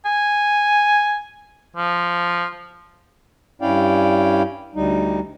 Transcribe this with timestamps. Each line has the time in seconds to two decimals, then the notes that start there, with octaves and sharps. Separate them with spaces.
0.05 G#5
1.76 F3
3.62 G2 C#4 E4 D5 F5 G5
4.75 D2 G3 D#4